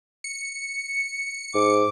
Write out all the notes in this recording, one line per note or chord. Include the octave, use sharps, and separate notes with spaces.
C#7
G#2 D6